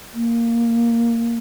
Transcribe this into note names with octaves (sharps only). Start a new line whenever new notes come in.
A#3